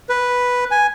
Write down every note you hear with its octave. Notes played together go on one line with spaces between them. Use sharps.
B4
G#5